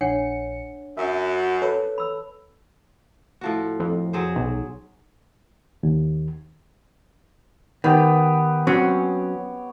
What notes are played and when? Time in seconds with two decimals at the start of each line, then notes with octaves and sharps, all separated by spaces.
0.01 A#1 D4 C#5 F#5 C#7
0.97 F#2 E5
1.62 A4 B4 C#5
1.98 B5 E6
3.41 A2 F3 F#4
3.80 F2
4.13 F#3 G#4 C5
4.36 B1
5.83 D#2
7.84 D#3 B3 G4
8.67 F#3 C4 C#4 C#5